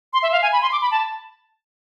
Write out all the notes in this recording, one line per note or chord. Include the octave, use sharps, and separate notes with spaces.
C6
E5
F5
G#5
B5
C6
D6
B5
A5